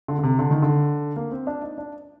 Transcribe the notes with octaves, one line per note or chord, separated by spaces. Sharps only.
D3
D3
C3
D3
D#3
D3
A#3
C4
D4
D#4
D4